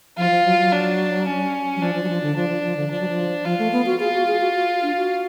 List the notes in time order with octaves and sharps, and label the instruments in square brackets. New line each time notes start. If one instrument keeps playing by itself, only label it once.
[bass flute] F3 [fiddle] F4
[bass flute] F3
F#3
F#3
[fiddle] D4
C#4
[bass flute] F#3
[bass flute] F3 [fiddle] D4
[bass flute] F3
F#3
F3
D3
[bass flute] F3 [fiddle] D4
[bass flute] F3
F3
D3
[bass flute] F3 [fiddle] D4
[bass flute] F#3
F3
[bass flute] F3 [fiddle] F4
[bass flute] A3
B3
F#4
[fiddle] F4 [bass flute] G#4
[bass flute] F#4
G#4
F#4
F#4
D4
F#4